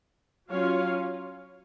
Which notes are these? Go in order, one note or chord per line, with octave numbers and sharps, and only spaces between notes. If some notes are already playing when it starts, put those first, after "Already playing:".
F#3 C#4 F4 C#5 F5